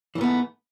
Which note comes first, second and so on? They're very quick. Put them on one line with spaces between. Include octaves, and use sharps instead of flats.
E3 G#2 B3 A3